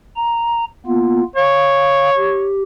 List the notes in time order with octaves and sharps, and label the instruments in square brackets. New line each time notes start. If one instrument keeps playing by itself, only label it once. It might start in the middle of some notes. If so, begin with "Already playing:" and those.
[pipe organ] A#5
A#3 B3 F4
[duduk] C#5 [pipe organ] F5
[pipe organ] G4